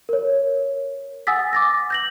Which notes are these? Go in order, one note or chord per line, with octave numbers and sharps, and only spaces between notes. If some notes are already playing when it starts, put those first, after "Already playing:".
A#4 C#5
F#5 G#5 D#6 E6 A6 B6
D6 A6 A#6
G6 A#6 F#7